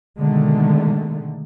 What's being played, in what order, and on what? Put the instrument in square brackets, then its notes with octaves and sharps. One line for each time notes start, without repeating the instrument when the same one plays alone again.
[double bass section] B2 D3 D#3 G#3 A3